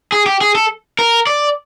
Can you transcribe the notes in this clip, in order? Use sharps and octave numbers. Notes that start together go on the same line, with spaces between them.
G#4
G4
G#4
A4
A#4
D5